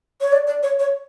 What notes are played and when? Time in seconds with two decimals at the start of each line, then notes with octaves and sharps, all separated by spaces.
0.21 C#5
0.32 D5
0.47 D5
0.63 C#5
0.79 C#5